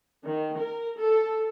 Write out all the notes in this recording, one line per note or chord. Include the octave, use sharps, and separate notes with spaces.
D#3
A#4
A4